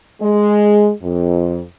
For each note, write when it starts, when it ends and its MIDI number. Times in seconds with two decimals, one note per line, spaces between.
0.22 0.91 56
1.03 1.62 41